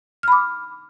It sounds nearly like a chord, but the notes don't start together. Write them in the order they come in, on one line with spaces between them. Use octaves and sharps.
F6 B5 D6